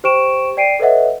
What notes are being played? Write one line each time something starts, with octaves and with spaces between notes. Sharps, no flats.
G4 C5 G5 C#6 D7 E7
D5 G5 C7 D7 D#7
A4 B4 C#5 D#5 E5 F#5